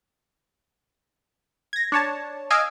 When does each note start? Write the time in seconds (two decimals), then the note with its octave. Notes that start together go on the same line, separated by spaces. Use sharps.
1.73 G#6 A#6
1.92 D4 C#5 A5
2.50 D#5 F5 G#5 E6 D7